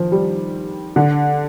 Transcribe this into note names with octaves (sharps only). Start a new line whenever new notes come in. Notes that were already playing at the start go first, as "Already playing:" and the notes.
Already playing: D#3 F3
G3
D3